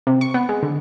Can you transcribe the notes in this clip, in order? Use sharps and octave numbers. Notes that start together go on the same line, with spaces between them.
C3
C#6
B3
G#3
D3